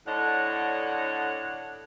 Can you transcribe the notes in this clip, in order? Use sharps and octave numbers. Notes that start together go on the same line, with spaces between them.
A2 D3 D4 C#5 D#5 F#5